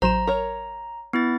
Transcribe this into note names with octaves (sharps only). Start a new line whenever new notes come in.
A1 F#3 C5 A#5 E7
A#4 C#5
B3 E4 A6